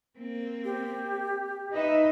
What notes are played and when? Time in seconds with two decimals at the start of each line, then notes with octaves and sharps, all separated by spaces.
0.18 A#3 C4
0.65 G4
1.74 D#4 B4 D#5 E5